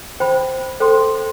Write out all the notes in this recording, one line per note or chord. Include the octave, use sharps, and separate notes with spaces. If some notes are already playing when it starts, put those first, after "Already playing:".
C5 G5 B5
A4 C5 G5 C6